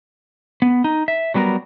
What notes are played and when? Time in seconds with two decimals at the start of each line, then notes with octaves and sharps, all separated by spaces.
0.62 B3
0.84 D#4
1.08 E5
1.34 F#3 G3 B3 F#4 A#4